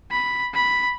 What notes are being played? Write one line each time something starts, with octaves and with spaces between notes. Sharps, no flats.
B5
B5